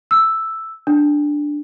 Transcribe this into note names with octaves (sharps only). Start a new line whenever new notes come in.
E6
D4